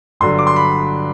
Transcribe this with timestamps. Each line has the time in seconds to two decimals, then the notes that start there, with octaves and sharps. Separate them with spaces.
0.20 G1 G2 D3 F#3 C6
0.38 D6
0.47 C6
0.56 B5